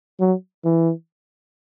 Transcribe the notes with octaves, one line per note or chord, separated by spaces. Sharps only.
F#3
E3